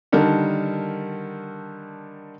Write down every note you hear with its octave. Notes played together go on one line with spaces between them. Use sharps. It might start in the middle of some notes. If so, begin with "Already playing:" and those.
D3 D#3 G3 A#4 A5